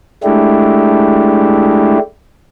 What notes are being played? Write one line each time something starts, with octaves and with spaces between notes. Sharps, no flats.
G#3 A3 D4 E4 G4